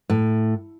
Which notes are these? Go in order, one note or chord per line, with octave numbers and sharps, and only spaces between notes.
A2